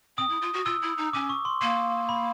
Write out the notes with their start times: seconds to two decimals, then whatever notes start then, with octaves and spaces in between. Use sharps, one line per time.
0.18 C4 D#6
0.30 E4
0.42 F4
0.54 F#4
0.65 F4 E6
0.82 E4
0.98 D#4
1.13 C#4 D6
1.29 C#6
1.45 C6
1.61 A#3 C6
2.09 B5